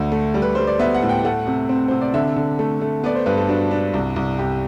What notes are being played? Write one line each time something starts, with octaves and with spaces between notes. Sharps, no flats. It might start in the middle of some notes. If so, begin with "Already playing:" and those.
Already playing: D2 A3 D4
A3
G3
B4
G3 C5
D5
B3 E5
F#5
A2
G5
A3 F#5
C3
C4
C3 C5
D5
D3 E5
D3
A3
A3
B3 D5
C5
G2 B4
A4
D4 F#4
D4
C2
C2
C2 G4